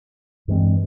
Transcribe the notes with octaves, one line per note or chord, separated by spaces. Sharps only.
G2 E3 G#3 C4